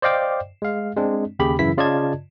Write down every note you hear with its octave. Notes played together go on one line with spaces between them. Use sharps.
C5 D5 D#5 F5 G5 D6
G#3 F5
G#3 C4 D4
D#2 C#3 G4 G#4 B5
F#2 C#3 E3 E4 B6
C#3 F4 D5 D#5 A5 G#6